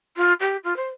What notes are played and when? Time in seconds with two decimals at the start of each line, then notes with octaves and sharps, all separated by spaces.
0.16 F4
0.40 G4
0.64 F4
0.76 C5